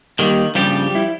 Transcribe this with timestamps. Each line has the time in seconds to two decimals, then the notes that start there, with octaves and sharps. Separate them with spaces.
0.19 D#3 G3 A#3 G4
0.55 G2 C#3 F3 G3 G4
0.95 E4